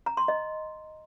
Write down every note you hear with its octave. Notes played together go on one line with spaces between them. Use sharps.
A#5
C6
D#5